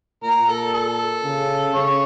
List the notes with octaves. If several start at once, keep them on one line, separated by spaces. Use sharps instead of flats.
A#2 A#4
A4
A4
C#3
C#3 C#5